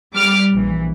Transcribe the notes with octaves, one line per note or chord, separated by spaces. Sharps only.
G3 D6 F6
A#1 E3